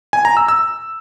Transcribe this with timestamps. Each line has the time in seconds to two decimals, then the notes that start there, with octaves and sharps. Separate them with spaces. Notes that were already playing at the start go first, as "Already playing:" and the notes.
0.13 G#5
0.25 A#5
0.37 E6
0.48 E6